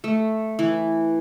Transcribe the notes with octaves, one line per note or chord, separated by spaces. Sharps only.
A3
E3